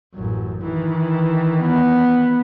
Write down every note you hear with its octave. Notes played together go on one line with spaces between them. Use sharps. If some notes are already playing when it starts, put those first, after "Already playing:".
A1 F#2
D#3 E3
B3